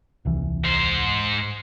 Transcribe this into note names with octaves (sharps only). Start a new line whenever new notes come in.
D#1 C2 E3
G#2 C5